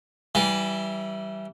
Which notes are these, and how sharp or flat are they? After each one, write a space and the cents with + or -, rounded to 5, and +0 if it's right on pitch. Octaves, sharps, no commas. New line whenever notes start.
E3 +0 G3 -20